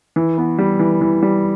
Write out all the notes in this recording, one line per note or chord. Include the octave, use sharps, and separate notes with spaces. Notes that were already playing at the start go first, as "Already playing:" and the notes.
E3
B3
G3
E3
E3
G3